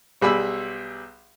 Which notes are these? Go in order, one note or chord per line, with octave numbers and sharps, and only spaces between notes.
B1 G3 G#4 B5 E6